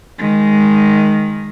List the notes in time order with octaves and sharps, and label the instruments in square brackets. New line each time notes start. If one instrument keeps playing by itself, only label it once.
[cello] D#3 G#3